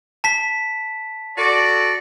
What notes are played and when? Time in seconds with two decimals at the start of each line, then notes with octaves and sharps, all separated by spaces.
0.24 A5 B6
1.37 F#4 A4 D5